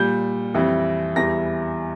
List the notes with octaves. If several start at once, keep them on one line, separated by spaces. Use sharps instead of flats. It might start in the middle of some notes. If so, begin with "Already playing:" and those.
Already playing: A#2 G3 G6
F2 E3 G3
E2 E3 G3 A#6